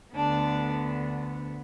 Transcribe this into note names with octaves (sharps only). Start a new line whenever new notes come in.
D2 D3 B3 D4